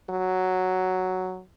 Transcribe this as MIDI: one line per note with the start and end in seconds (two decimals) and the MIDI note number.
0.10 1.42 54